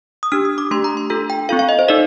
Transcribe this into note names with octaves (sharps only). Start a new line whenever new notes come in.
D#6
D4 G4 F6
D#6
D6
A3 D4 G4 C6
A#5
C6
D4 F4 A4 A#5
G5
C4 F4 A4 F5
F5
D#5
C5
D#4 A4 D5